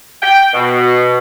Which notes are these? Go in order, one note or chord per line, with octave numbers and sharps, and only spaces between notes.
G5
B2